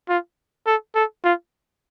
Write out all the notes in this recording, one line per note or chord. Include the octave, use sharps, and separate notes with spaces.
F4
A4
A4
F4